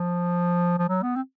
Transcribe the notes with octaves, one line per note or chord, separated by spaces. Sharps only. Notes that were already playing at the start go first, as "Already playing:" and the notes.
Already playing: F3
F3
F#3
B3
C4